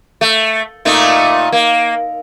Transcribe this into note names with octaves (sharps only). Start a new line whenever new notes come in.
A3
A#2 A3 D#4
A#3